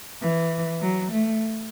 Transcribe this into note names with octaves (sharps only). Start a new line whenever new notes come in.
E3
F#3
A3